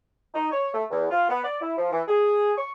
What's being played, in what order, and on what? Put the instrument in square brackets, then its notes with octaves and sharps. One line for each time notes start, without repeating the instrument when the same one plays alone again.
[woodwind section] D#4
C#5
A3
E2
F4
B3
D5
E4
F3
E3
G#4
C#6